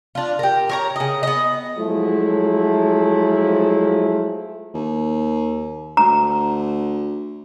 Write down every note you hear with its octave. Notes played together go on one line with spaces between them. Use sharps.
D4 F4
G4 A#4
A#4 C#5 A#5
C#3 D#5
B3 D#5
F3 F#3 G#3 A3 E4
D#2
D2 A#5